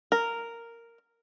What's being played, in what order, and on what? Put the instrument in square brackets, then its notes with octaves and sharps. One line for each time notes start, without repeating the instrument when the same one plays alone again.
[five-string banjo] A#4